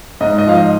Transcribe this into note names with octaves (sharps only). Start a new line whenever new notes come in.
G#2 D#5
D#5
F3 F5
D#5